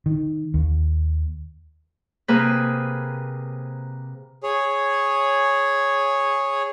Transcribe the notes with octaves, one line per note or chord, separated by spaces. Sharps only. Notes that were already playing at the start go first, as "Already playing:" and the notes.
D#3
D#2
C3 A#3 G#4 B4
G#4 C#5